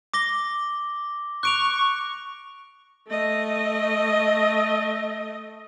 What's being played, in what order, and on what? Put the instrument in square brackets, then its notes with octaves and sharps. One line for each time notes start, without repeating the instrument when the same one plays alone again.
[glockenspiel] D6 A#6 G7
[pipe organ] C#6 [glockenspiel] F#6 D7 F7
[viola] A3 D#5